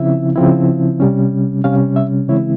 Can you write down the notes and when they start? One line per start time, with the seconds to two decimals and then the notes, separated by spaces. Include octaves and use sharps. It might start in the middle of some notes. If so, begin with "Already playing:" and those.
Already playing: C#3 F3 C4 E4 E5
0.36 C#3 F3 C4 E4
1.00 C3 G3 C#4
1.64 C3 G3 C#4 F5
1.96 E5
2.28 C#3 E3 G#3 C4 E4 C#5